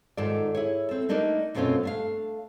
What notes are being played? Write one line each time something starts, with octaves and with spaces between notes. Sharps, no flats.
G#2 D#3 F4 A4 D5
E4 G#4 C#5
C4 A4
A3 A#3 D4 D#4 A#4 D5
F#2 B2 A3 C4 C#4 F4
A3 D4 F5